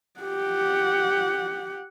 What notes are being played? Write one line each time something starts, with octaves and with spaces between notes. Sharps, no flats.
G4 F#5